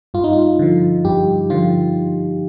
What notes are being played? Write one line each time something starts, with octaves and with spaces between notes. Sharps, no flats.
G2 F4
D#4
F4
D3 F3
G2 G4
D3 F3 F4